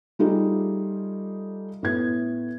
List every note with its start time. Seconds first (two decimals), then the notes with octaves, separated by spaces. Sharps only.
0.19 G3 A3 D#4 F4 G4 G#4
1.83 A2 B3 G#6